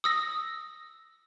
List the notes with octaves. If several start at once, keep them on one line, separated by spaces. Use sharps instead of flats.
D#6 E6 A#6